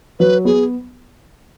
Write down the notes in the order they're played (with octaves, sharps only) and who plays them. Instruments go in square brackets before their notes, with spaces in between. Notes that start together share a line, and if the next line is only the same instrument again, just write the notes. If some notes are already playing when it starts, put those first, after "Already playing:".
[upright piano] F#3 [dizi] B4
[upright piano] B3 [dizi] G#4